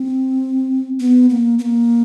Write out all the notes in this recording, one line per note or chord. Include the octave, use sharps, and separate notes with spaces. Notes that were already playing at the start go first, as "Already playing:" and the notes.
Already playing: C4
B3
A#3
B3
A#3